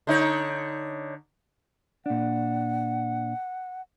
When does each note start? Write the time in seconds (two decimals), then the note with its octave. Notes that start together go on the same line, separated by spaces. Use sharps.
0.07 D3 D#4 C#5
2.06 A#2 D4 F#5